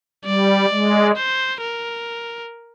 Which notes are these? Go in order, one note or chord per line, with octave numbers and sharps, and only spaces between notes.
G3 D5
G#3
C5
A#4